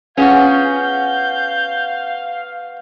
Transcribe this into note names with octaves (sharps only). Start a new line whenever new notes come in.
B3 C#4 F4 F#4 G#4 F5 G6